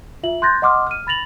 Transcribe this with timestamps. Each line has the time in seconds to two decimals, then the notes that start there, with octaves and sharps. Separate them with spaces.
0.23 F4 E5 F#7
0.42 C6 F#6 G6 A6 A#6
0.62 D#5 F#5 C6 D6 D#6 F6
0.87 F6 D#7
1.07 B5 A6 A#6 F7 F#7